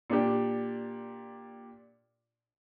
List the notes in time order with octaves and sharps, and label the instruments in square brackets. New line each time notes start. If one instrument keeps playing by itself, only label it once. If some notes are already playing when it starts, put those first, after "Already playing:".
[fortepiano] A#2 D4 G4